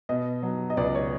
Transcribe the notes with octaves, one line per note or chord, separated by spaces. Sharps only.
B2 D#5
F#3
D#5
C#2 D5
C#5